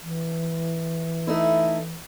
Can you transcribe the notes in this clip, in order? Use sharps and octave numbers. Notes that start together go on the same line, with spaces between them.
E3
A3 D#4 E4